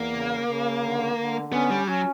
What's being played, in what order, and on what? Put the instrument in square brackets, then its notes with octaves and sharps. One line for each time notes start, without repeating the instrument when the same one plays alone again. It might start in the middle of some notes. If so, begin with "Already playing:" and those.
Already playing: [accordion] E2 [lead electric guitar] A#3
[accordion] C#3
C#3
D3
D3
[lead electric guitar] B3 [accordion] C#4
[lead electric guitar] G3
[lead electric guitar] F#3 [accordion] C#4